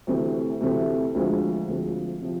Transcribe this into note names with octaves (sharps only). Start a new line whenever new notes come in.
D2 C3 E3 A3 C4
D2 C3 E3 A3 C4
D2 D3 F3 G#3 C4
D2 D3 F3 G#3 C4
C3 F3